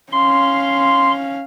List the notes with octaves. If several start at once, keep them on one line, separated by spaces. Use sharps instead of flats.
C#4 F5 C6